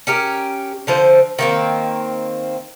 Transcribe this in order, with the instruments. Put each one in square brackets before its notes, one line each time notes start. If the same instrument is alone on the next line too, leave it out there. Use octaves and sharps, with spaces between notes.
[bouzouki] C#4 G4 A#4
D3 F3 C5
D#3 A#3 C4